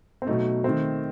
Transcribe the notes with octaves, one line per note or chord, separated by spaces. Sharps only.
C4
B2 F#3 A3 D#4
D#3 A3 C4